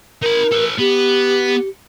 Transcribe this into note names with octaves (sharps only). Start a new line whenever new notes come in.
D#4 A#4 B5
A4 B4
B3 G4